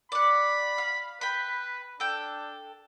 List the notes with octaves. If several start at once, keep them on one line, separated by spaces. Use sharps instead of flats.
D5 F#5 B5
F5
B4 G5 B5
D4 A4 G5